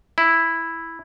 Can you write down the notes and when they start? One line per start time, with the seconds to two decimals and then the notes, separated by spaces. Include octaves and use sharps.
0.18 E4